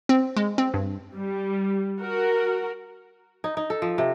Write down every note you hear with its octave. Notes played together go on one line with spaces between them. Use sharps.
C4
G#3
C4
G2
G3
F#4 A#4
D#4
D#4
A4
F3
C3